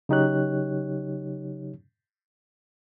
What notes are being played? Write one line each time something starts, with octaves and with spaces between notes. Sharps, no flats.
C#3 F#3 D#4 G4 C#5 F#6